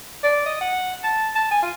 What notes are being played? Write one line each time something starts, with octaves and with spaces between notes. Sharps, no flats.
D5
D#5
F#5
A5
A5
G#5
F4